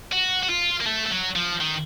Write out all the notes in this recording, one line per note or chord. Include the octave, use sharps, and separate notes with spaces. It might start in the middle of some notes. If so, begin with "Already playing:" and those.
F#4
F#4
F4
A#3
A3
A3
F#3
F3
D#3